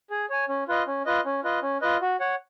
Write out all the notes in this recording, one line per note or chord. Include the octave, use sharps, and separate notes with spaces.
G#4
C#5 G#5
C#4
F4 B4 D#5
C#4
F4 B4 D#5
C#4
F4 B4 D#5
C#4
F4 B4 D#5
F#4
C#5 F#5